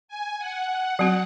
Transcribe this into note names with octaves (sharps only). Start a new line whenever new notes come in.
G#5
F#5
F#3 C4 F#4